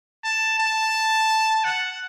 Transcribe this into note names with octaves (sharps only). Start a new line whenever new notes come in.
A5
A5
F#5